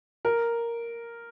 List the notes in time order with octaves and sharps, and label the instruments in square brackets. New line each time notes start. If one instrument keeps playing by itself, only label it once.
[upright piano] A#4